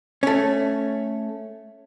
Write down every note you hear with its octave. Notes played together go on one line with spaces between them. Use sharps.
A3 C#4